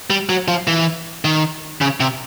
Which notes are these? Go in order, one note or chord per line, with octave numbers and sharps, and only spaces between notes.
G3
F#3
F3
E3
D#3
C#3
C3